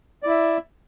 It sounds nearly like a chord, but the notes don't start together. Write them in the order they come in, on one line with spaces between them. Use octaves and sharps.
D5 E4 E5